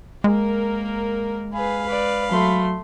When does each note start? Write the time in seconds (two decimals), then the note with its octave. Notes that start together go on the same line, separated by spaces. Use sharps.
0.24 G#3 A#3 A#4
1.54 G#4 B4 F5 B5
1.86 B4 D5
2.32 F#3 A3 C6